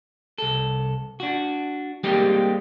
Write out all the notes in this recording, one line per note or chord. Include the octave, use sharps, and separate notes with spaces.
C2 A4
D4 F#4
G3 G#3 A#3 C4 D#4 G4